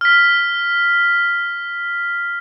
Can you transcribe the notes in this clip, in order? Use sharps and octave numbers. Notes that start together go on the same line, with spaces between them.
F6 B6